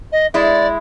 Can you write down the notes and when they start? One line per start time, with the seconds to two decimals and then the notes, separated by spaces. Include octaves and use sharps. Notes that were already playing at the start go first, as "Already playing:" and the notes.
0.12 D#5
0.34 G#3 E4 D5